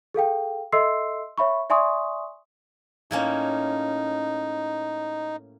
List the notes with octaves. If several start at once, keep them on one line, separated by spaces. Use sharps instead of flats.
G#4 A4 F5 G5
A4 D#5 E5 C6 E6 C7
C#5 E5 B5 C#6
D5 E5 G#5 C6 C#6 D#6
A2 A#3 C#4 D#4